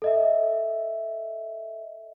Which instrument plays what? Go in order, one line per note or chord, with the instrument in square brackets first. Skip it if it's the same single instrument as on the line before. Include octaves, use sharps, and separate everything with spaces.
[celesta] A4 D#5 E5